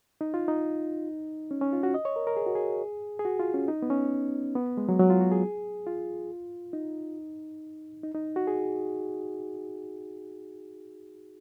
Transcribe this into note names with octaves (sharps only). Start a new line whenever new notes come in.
D#4
F4
D#4
C#4
C#4
F4
F#4
D#5
C#5
A#4
A#4
G#4
F#4
G#4
G#4
F#4
F4
C#4
D#4
B3
C#4
B3
G#3
F#3
F#3
F4
F#4
G#4
F4
D#4
D#4
D#4
F#4
G#4